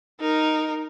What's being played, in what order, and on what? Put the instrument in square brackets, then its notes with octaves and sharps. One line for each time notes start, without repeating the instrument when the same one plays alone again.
[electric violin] D#4 A#4